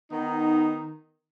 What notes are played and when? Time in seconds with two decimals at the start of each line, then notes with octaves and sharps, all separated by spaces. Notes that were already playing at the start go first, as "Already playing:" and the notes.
0.10 D#3 B3 D#4